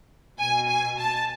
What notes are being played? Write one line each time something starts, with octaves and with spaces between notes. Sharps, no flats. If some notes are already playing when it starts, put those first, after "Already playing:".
B2 G#5
G#5
A5